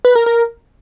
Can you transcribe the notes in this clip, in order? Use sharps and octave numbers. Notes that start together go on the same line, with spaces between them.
B4
A#4
A#4